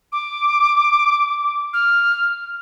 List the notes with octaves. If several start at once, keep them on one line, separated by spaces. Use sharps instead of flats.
D6
F6